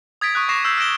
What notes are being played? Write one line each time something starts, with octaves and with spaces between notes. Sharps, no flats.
D#6 G#6 A6 B6 D7
C#6 D#6 F#6 B6
C#6 D6 A#6 C7 E7
C#6 E6 F6 G6 C7 E7
F6 G#6 A#6 D7 E7 G7